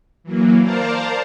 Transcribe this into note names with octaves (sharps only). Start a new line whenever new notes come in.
E3 F#3 A#3
A#4 C5 D5 F5 A5 A#5